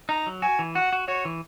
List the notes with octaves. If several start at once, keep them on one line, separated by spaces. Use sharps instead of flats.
D#4 A#5
F#3
F#4 G#5
E3
F#4 F#5
F#4
F#4 C#5
E3